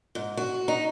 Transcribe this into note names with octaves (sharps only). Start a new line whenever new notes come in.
G#2
F#4
D#4